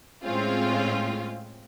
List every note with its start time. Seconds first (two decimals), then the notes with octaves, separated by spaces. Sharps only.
0.25 A2 G#3 C4 C#4 F4